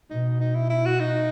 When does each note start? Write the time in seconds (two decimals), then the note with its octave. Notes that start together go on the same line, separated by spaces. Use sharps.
0.10 B2 D#4
0.40 D#4
0.55 E4
0.70 E4
0.85 F#4
1.00 D#4